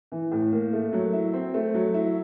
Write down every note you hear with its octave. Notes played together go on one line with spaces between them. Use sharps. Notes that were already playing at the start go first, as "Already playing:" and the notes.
E3
A2
A#3
A3
F#3
E4
C4
A3
F#3
E4